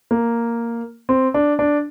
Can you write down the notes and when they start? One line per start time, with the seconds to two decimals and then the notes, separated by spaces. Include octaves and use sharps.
0.11 A#3
1.09 C4
1.34 D4
1.59 D4